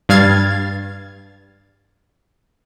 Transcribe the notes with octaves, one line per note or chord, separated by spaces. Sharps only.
G2 G3 F5 F6 G#6 A6